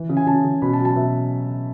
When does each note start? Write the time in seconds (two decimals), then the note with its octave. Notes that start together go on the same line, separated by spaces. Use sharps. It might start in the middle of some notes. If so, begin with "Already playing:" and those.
Already playing: E3
0.09 C#3
0.17 G#5
0.27 C#3 A5
0.44 C#3
0.62 B2 B5
0.73 A5
0.80 F#3
0.85 A5
0.96 B2 E5